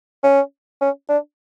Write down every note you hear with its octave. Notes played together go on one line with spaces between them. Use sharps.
C#4
C#4
D4